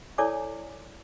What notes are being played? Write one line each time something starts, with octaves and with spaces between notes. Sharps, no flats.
E4 A4 C#5 D5 G#5 D6